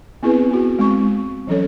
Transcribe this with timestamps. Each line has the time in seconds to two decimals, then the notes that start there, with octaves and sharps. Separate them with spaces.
0.23 B3 C4 E4 G#4 B4
0.51 B3 F#4
0.79 G#3 C4 C#6
1.47 E3 F#3 C#4 A4 C#5